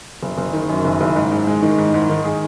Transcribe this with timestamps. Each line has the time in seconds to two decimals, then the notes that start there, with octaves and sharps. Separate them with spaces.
0.23 F#1
0.38 F#1
0.53 D#3
0.69 F#2
0.85 F#1
1.01 F#1
1.16 G#2
1.32 G#2
1.47 G#3
1.62 D#3
1.78 G#2
1.94 G#2
2.10 D#3
2.25 G#4